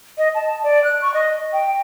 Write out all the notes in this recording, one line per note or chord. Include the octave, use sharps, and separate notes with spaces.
D#5
A5
D5
F#6
C#6
D#5
G5